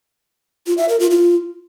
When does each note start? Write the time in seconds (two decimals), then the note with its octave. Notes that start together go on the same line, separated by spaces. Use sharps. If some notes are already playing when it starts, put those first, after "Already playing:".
0.67 F4
0.78 E5
0.89 A#4
1.00 F4
1.11 F4